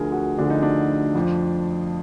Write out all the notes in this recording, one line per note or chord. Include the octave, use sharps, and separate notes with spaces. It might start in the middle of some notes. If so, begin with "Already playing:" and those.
Already playing: D2 D3 F3 G#4 A#4
F#4
D2 D3 F3 D4
D#4
D4
F2 F3